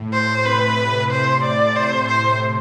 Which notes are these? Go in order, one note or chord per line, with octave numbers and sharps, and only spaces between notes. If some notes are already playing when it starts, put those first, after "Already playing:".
Already playing: A2
C5
C3 B4
C5
D5
C5
C5